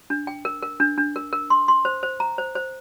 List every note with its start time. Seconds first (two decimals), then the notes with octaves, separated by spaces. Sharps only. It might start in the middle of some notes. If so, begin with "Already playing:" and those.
0.10 D4
0.27 G5
0.45 A#4
0.63 A#4
0.80 D4
0.98 D4
1.16 A#4
1.33 A#4
1.50 C6
1.68 C6
1.85 C5
2.03 C5
2.20 A#5
2.38 C5
2.55 C5